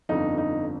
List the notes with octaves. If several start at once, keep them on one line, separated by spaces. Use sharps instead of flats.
G1 F2 D3 D#4
D#4